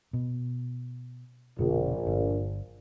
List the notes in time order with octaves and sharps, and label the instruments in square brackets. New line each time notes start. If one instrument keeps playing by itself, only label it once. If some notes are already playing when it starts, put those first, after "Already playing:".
[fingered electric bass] B2
[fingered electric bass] F1 B2 D3 [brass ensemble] A#1
[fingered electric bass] G1